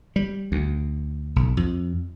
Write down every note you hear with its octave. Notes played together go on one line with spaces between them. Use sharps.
G3
D2
B1
F2